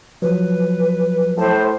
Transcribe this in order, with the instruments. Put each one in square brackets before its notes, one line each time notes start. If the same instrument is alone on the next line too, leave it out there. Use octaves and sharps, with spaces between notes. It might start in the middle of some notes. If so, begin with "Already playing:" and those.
[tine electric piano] F3 F#3 [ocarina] B4
[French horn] A2 [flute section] C5 [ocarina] A5